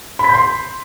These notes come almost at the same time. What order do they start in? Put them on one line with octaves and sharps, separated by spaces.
B5 B6 G6 C6